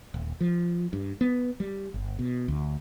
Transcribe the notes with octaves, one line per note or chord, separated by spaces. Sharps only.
D#1
F3
G2
B3
G3
G1
B2
D2